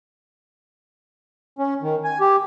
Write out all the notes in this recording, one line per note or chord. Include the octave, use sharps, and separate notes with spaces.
C#4
D#3
G#5
G4